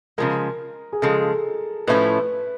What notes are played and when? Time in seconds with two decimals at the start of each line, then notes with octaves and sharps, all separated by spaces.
0.18 C#3 F3 G#3 A#4
0.93 G#4
1.02 C#3 F3 G#3 A4
1.87 A2 F3 A3 C#4 E4 B4